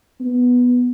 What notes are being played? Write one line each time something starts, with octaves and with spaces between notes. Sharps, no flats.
B3